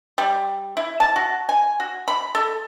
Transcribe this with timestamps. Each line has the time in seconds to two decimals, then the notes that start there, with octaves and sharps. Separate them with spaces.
0.18 G3
0.77 E4
1.00 A5
1.16 F#4
1.49 G#5
1.80 F#4
2.08 B5
2.35 A4